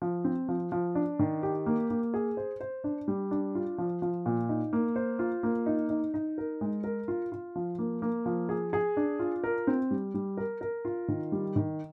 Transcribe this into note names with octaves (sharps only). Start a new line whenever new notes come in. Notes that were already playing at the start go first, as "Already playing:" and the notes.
F3
C4
F3
F3
D4
D#3
G4
A#3
A#3
G#4
C5
C5
D4
G3
D4
F4
F3
F3
A#2
D#4
A#3
C5
F4
A#3
D#4
D#4
D#4
A#4
G#3
A#4
F4
F4
F3
A#3
A#3
F3
G#4
G#4
D4
F4
A#4
C4
G3
G3
A#4
A#4
F4
D#3
G3
D#3